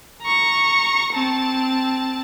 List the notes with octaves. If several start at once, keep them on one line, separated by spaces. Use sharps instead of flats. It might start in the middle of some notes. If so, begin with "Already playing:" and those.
A#5 C#6
C4 A5